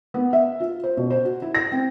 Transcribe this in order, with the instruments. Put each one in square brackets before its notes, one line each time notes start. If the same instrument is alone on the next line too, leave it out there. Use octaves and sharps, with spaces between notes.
[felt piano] B3
E5
F4
C5
B2
C5
F#4
E4
A#6
C4